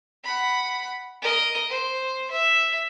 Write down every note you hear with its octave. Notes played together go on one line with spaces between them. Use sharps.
F#5 B5
A#4 D#5
C5
E5